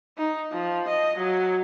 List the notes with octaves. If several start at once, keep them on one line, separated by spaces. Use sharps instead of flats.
D#4
F3
D#5
F#3